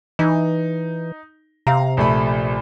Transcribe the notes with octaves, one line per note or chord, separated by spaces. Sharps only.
E3 D#4
C3 F5 A#5
A#1 A3 B5